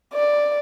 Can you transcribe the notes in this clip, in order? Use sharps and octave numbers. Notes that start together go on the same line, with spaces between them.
D5